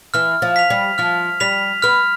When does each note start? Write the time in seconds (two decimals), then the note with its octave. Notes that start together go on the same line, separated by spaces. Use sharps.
0.14 E3 F6
0.42 F3
0.56 B6 F7
0.70 G3
0.98 F3 F6
1.40 G3 B6 F7
1.82 B3 F6